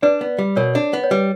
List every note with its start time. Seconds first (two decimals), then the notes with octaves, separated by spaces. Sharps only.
0.02 D4 B4 D5
0.21 B3
0.38 G3
0.56 B2 A#4 C#5
0.75 D4
0.93 B3
1.04 C#5
1.11 G3 B4